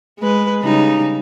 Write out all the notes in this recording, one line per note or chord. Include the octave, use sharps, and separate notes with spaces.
G#3 B4
C#3 G3 D#4